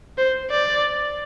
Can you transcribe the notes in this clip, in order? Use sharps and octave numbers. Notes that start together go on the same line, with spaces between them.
C5
D5